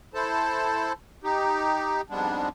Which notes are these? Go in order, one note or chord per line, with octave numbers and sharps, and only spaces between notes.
E4 A4 C5 A5
D#4 G4
F2 G#2 G3 G#3 B3 D4